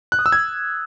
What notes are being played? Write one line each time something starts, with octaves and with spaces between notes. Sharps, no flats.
F#6
D#6
E6
G#6